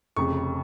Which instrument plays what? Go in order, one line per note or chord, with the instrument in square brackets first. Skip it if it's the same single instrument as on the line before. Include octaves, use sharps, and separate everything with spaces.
[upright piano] F1 F2 C#3 C#6